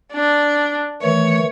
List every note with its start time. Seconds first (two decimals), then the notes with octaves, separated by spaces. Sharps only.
0.13 D4
1.02 D#3 E3 A3 C#5